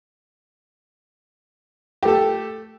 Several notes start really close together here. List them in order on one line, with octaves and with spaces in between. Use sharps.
G4 A3 A4